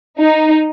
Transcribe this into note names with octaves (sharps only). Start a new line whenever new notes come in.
D#4